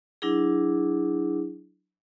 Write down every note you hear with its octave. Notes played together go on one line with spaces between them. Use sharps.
F#3 D4 E4 G#4